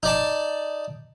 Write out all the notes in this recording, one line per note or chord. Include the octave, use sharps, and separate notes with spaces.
D#4 D5 A5